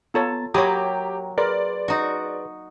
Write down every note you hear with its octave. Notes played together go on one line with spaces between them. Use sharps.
B3 F4 A4 C#5 A#5 A6
F#3 A#3 G4 C#5 G5 A#5 B5 D#6
G#4 A#4 B4 D5 C6
D#4 F#4